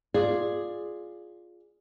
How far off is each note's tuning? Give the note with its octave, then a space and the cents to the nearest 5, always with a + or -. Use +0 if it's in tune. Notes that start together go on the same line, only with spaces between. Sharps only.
F4 +0 G#4 +0 D5 +5